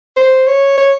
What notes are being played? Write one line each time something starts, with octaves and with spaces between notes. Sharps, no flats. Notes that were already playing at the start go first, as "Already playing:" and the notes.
C5
C#5
C#5